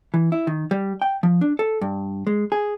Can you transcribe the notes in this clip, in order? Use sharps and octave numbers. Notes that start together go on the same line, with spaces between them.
E3
E4
D#3
G3
G5
F3
D4
A4
G2
G#3
G#4